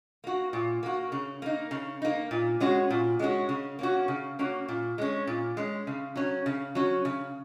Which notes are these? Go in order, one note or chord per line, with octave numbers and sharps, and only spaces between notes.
A#3 F#4
A#2
A#3 F#4
C#3
A#3 D#4
C#3
A#3 D#4
A#2
G#3 C#4 F#4
A#2
G#3 C#4 F#4
C#3
A#3 C#4 F#4
C#3
A#3 C#4 F#4
A#2
G#3 C#4
A#2
G#3 C#4
C#3
F#3 C#4
C#3
F#3 C#4
C#3